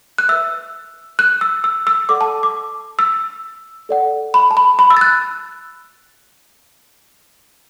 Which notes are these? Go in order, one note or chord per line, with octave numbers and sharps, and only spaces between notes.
F#6
B4 E5 E6
F#6
E6
E6
E6
A4 D5 F#5 D6
A5
D6
E6
A4 D5 F#5
B5
A5
B5
B5
E6
A6
F#6